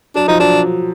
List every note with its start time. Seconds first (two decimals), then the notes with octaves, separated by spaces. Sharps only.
0.15 F#3 D4
0.28 F3 D#4
0.40 F#3 D4